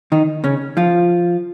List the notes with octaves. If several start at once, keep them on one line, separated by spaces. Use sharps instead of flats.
D#3 D#4
C#3 C#4
F3 F4